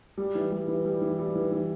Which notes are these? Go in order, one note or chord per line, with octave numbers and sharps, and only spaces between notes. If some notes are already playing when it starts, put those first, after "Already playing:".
G3
E3
G3
E3
G3
E3
G3
E3
E3